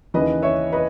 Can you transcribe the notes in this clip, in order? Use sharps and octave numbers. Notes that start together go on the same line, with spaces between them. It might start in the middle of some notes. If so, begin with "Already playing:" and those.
D#2 C#3 E3 B4 D#5
C#5 E5
B4 D#5